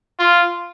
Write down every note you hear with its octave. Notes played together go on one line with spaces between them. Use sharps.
F4